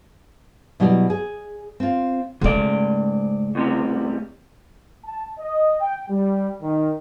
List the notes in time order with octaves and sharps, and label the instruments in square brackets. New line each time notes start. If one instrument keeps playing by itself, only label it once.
[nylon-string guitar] B2 F#3 G3 E4 D5
G#4
C4 F4
[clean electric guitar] G#2 D5 [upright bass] C#3 A3
[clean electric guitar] D2 C3 G3
[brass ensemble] A5
D#5
G5
G3
D#3